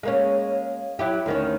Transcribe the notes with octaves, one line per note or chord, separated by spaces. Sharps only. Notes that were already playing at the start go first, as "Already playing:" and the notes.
G#3 A#3 C#4
F#3 E4 G4
D2 D#3 C#4